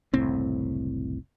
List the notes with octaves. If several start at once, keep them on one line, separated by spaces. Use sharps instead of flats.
F#1 C2 A2 C4